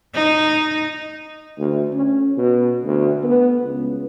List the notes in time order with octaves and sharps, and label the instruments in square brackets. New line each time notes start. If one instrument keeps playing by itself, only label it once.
[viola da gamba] D#4
[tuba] D2
C#4
B2
D2
B3
C#2